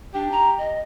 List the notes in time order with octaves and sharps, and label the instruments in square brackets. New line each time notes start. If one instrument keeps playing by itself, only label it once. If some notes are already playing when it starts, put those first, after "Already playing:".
[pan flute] D4 [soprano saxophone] G4
[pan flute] A#5
D#5